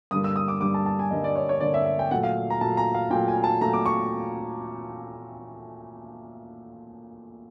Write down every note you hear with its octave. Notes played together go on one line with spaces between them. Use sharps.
G2 D3 G3 A#3 D#6
E6
D#6
D6
G2 D3 G3 A#3 D6
A5
A5
G#5
G2 D3 G3 A#3 D#5
D5
C#5
C#5
G2 D3 G3 A#3 D5
E5
E5
G5
A#2 F#3 A3 F#5
F5
A#5
A#2 F#3 A3 A5
A#5
F5
A#2 F#3 A3 G5
G#5
A5
A#2 F#3 A3 A#5
D6
C#6